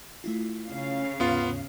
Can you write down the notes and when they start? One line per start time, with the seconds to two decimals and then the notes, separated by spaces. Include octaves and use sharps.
0.24 A3 E4 F4
0.67 C#3 C#4 F5
1.20 D#2 G#2 B3 F4